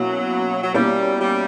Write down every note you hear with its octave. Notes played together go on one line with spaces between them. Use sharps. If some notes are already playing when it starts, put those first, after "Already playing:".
Already playing: B2 F#3 A#3 C#4 E4
F#3
B2 G3 A#3 C#4 E4
G3